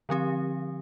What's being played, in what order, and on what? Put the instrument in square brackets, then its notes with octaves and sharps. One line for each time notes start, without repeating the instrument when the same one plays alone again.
[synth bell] D3 F3 C4 G4